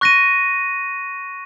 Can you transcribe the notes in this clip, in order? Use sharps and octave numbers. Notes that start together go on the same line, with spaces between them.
C#6 F#6 A#6 D#7